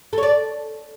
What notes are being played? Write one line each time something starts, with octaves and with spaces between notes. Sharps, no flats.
A4
C#5
D5